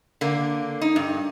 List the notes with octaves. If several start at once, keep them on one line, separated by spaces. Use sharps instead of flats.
D3 A#3
D#4
G2